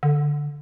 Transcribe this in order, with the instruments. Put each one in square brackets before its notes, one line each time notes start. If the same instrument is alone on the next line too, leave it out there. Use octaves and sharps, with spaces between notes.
[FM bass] D3